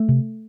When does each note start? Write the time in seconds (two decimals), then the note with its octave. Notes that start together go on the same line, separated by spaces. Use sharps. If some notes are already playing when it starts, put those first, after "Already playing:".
Already playing: A3
0.09 C3